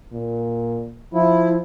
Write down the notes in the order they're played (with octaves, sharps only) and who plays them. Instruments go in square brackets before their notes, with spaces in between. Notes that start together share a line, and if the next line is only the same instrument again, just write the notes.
[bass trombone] A#2
[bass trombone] F3 [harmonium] E4